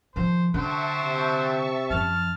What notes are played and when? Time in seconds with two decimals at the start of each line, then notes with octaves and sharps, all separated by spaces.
0.16 D#3 F3 C5
0.54 D3 F#3 C5 E5 G5 A5 C#6
1.00 C3
1.90 F#2 F3 A5 F6